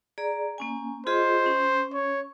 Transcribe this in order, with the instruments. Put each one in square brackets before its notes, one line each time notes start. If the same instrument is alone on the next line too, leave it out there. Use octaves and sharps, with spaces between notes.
[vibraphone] G#4 D5 A#5
A#3 C#4 G#5
[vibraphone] F4 G#4 D#5 [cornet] C5
[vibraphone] C#4
[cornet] C#5